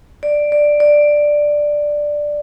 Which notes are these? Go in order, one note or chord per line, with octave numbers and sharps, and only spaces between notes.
D5
D5
D5